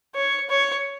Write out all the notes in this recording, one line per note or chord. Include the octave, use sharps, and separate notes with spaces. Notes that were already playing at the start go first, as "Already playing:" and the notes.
C#5
C#5